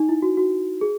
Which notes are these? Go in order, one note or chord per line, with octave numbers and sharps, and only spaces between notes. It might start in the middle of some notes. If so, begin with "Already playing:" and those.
Already playing: D#4
E4
F#4
F#4
G#4